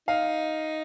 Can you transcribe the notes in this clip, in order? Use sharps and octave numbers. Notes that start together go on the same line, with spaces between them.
D#4 F5